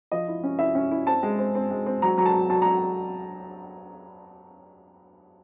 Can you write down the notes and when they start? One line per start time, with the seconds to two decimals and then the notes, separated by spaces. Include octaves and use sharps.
0.12 F3 D#5
0.28 E4
0.43 C#4
0.59 E4 E5
0.75 C#4
0.91 E4
1.07 C4 A5
1.23 G#3
1.38 C4
1.55 C4
1.71 G#3
1.86 C4
2.02 F#3 A#5
2.18 F#3 A#5
2.25 A5
2.34 F#3
2.50 F#3 A5
2.62 A#5
2.65 F#3